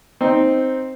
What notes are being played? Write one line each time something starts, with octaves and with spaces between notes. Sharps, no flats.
C4 D#4